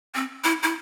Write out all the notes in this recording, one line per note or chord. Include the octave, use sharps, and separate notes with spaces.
C4
E4
E4